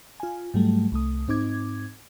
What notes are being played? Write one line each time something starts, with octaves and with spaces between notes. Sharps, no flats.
F4 G#5
G#2 F#3 G3 A3
C2 A3 D#6
G#2 C4 D#4 D6 G#6